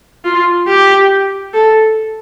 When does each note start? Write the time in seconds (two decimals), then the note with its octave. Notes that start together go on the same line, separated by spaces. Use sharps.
0.25 F4
0.68 G4
1.54 A4